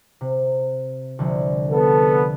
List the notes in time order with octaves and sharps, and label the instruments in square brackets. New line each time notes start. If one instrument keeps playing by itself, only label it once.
[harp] C3
C2 D3 F3
[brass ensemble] B3 A4